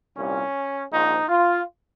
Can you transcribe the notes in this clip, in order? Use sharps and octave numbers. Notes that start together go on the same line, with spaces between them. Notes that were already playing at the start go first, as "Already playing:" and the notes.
C2 A#2 G3 C#4
A#1 G#2 F3 D#4
F4